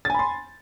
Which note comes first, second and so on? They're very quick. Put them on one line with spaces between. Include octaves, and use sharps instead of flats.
A6 G#5 B5 C6